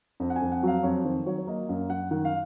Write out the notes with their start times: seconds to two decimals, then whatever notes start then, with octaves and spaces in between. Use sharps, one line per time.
0.20 F2
0.30 F#5
0.36 G#5
0.42 F2
0.52 F#5
0.63 F#3 F5
0.83 F2 C#5
1.05 D#3 C5
1.26 F#3 C#5
1.38 C#5
1.47 A#3 D#5
1.69 F#2 F5
1.89 F#2 F#5
2.11 D#3 F#5
2.25 F5